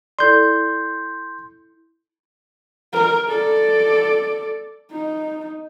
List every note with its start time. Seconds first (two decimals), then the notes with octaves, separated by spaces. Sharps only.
0.19 E4 A4 D5 C6 G6
2.93 A#4
3.28 A4 D5
4.92 D#4